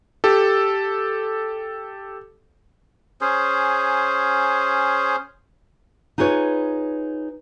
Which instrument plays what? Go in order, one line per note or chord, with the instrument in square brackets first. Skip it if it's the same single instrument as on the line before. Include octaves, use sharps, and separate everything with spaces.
[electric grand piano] G4 A4
[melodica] C#4 G#4 C5
[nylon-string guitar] D#4 F4 G#4 B4 C#5